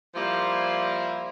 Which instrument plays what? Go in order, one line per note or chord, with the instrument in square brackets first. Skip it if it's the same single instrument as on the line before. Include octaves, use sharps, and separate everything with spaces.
[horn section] F3 G3 A#3 E4 C5